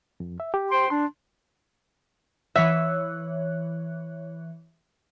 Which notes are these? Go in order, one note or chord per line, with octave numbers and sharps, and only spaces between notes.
F2
E5
G4
C5 G5 C6
D4 C6
E3 C#5 E5 F#6